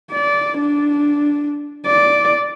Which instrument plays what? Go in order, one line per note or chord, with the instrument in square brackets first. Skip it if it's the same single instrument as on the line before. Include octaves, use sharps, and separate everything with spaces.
[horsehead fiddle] D5
D4
D5